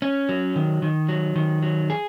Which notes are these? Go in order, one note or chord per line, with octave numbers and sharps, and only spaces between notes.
C#4
F#3
D#3
D#3
F#3
D#3
F#3
G#4